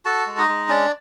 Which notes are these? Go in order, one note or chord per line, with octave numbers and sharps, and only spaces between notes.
F#4 A4 A5
G#3
D#4 D#5
G#3
C#4 D4 D5